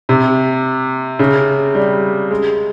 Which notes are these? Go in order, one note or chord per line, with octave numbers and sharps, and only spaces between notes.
C3
C#3
G3
G#3